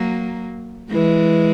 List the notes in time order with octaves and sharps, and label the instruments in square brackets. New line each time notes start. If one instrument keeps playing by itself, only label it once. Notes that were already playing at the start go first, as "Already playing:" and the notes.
Already playing: [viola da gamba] F#3 A#3
E3 G#3